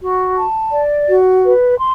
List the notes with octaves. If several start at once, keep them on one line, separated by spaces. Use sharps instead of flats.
F#4
A5
D5
F#4
B4
C6